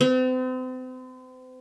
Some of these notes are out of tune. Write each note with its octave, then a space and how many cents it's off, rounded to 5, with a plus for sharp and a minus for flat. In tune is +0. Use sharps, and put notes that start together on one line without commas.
C4 -40